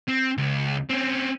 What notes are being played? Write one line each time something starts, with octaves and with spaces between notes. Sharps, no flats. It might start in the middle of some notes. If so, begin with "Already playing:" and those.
C4
C#2
C4 C#4